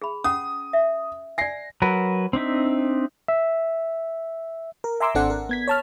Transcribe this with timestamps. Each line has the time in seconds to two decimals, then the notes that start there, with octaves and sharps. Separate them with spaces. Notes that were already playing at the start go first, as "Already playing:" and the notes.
0.02 G#4 B5
0.24 C#4 F#5 D#6
0.73 E5
1.38 D5 G#5 A#6 C7
1.82 F#3 A#4 B4
2.33 C4 D4 D#4 E5
3.28 E5
4.84 A#4
5.00 E5 G#5 A#5 C6 D6 E6
5.15 G#1 C4 D4 A4 D5 F#5
5.30 A#4
5.49 B3 G#6 B6
5.68 C#5 A5 F6